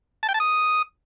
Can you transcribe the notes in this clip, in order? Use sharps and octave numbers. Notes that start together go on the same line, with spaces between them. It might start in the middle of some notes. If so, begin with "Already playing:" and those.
A5
G5
A5
D#6